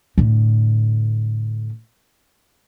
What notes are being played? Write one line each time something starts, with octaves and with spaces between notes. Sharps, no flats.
A2 D3